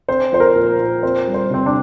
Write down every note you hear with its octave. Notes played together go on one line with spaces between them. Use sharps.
C4 C5
F3 C5
A#4
A#2
A#2
C4 C5
G3
C5
C3 C4
D4